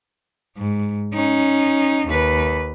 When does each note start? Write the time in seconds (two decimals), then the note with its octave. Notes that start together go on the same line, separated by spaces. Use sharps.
0.57 G#2
1.14 C#4 D#4
2.07 D#2 B4